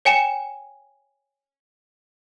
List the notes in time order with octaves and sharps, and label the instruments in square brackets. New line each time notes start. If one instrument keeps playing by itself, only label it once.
[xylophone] C#5 G5 G#5 C#7 E7